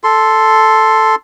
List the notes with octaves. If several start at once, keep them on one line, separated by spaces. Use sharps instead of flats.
A4 C6